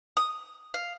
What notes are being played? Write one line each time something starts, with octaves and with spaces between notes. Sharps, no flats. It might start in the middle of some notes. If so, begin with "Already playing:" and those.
D#6
F5